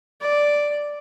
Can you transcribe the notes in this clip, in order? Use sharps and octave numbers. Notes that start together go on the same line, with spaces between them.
D5